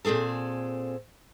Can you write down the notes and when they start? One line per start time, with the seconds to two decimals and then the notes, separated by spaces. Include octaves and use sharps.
0.05 A#2 C4 F4 G#4 A4